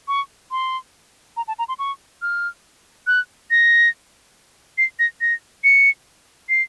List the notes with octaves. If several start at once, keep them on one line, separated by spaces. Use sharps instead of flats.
C#6
C6
A#5
A5
A#5
C6
C#6
F6
F#6
A#6
C7
A#6
A#6
C#7
C7